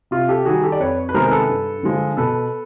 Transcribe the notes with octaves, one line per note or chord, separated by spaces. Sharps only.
C3 F4
G4 A4
D#3 G3 F#4 G#4
G4 A4
D5
F2 B4 C#5
B4
C3 D#3 G#3 B3 A#4 C5
A#4
A4 B4
G2
D3 F3 G#3
B2 A4 B4